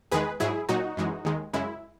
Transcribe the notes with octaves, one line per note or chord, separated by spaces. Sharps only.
E2 D#3 G#3 G#4 B4
G#2 F#3 E4 G#4
A#2 F#3 D#4 F#4
F#2 E3 G#3
D#2 D#3 G#3
F#2 C#3 G#3 E4